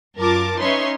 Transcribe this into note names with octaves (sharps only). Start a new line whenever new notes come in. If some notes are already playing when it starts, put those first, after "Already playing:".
F#2 F4 A#4 A5 D6
C#4 D#4 B4 C#5 E5 C6